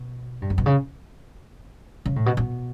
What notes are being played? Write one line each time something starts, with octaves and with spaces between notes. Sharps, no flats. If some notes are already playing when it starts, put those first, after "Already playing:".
Already playing: B2
G2
F#2
B2
C#3
C#3
A2
B2
B2